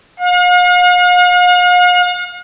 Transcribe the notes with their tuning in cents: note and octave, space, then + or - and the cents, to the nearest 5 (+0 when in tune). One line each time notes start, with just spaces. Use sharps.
F5 +45